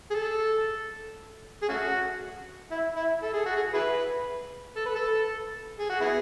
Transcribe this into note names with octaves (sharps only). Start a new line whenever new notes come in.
G#4
A4
G#4
A3 C#4 F#4
E4
E4
A4
G#4
F#4
G#4
E4 G#4 B4
A4
B4
A4
G#4
F#4
B3 E4 G#4